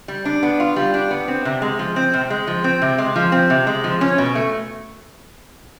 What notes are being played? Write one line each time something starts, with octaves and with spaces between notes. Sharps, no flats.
G3
D4
B3
F4
G3
D4
B3
C4
C3
G#3
F3
C4
C3
G#3
F3
C4
C3
G#3
F3
C4
C3
G#3
F3
C#4
B2
A3